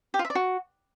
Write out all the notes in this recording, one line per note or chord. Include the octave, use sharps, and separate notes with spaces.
G4
F4
E5
D5
F#4